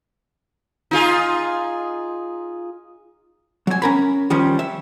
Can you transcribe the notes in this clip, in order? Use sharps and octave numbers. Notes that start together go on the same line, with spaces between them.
D#4 F4 G#4
F#3 G#5
C#4 A#4 B5
D#3 F3 G3 C#4
E5